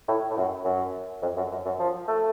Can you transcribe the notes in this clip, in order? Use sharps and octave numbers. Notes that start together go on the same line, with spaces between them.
A2
A2
F#2
F#2
F2
F#2
F#2
F#2
F3
A3